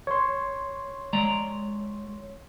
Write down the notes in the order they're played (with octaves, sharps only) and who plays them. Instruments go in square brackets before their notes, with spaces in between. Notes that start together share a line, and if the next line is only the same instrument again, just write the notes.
[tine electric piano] C#5 C6
[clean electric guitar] G#3 D5 A#5